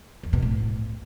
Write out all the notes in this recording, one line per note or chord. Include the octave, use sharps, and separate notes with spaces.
E2
B2
A2